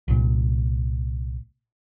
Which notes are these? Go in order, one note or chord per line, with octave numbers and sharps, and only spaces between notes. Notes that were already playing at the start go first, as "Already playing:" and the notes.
C2 A#2